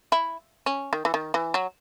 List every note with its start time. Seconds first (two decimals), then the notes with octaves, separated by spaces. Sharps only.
0.12 E4
0.66 C#4
0.93 D#3
1.05 E3
1.14 D#3
1.34 E3
1.54 F#3